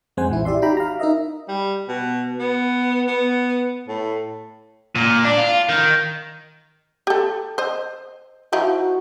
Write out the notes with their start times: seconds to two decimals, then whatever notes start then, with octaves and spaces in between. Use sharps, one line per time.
0.17 F2 G#3 C4 C5 F#5 G#5
0.30 A#1 E3 E4
0.45 G4 D5 E5 C6
0.62 D#4 F#4 G4 G5 A#5 B5
0.77 F5 A#5
1.00 D#4 A#4 D#5 E5
1.48 G3
1.88 B2
2.39 B3
3.07 B3
3.88 A2
4.95 A#2
5.25 D4
5.38 F4
5.69 D#3
7.07 G4 A4
7.58 C5 D#5
8.53 F3 D#4 E4 F#4